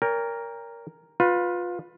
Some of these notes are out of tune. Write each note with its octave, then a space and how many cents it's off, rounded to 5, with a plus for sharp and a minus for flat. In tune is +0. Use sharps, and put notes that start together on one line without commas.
A#4 +0 C#5 +45 G5 +35
F4 +20 B4 +0